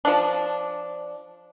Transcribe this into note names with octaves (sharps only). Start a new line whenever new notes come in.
F3 D4